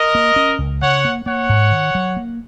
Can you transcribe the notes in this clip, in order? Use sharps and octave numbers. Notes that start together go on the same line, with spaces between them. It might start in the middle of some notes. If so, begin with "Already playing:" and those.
Already playing: A#4 D#5
A#3
C#4
C#2
C#3 C#5 F#5
A#3
A#3 C#5 F#5
G#2
D#3
F#3
A#3